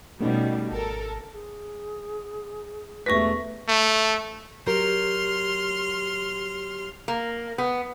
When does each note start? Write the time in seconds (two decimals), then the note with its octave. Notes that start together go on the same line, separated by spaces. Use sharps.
0.21 B2 G3 A3 C#4 D#4
0.72 G#1 A4 A#4
1.33 G#4
3.06 E1 A3 B4 C#6 A#6 B6
3.68 A3
4.67 F#3 G4 A#4 C6 F6
7.08 A#3
7.58 B3